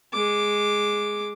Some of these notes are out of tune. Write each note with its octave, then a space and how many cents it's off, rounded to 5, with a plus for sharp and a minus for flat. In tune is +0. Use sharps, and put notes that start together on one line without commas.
G#3 +0 D6 +0